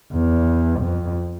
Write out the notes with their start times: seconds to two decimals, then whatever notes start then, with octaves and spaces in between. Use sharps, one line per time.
0.13 E2
0.80 F2